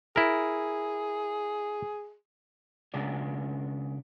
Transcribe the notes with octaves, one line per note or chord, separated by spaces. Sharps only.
E4 G#4 A#4
C#3 G#3 B3 D4 D5